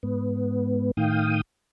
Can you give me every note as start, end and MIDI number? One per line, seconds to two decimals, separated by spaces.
0.03 0.91 44
0.03 0.91 59
0.97 1.41 45
0.97 1.41 51
0.97 1.41 77
0.97 1.41 79
0.97 1.41 87